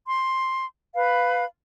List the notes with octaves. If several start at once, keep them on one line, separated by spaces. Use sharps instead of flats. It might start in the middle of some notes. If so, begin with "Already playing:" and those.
C6
B4 F5 B5